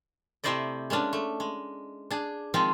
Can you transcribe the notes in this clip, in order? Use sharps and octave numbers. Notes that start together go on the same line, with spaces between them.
C3 A3 E4 C5 D5 D#5
G#3 A#3 C#4 D4
A3
G#3
D4 G#4
D#3 F3 G#3 C4 F4